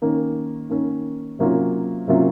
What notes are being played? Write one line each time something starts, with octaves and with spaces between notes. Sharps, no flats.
D#3 A#3 C#4
D#3 A#3 C#4
C3 F#3 A#3 C#4 F4
C3 F#3 A#3 C#4 F4